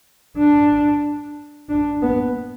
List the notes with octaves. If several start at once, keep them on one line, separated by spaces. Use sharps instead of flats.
D4
D4
B3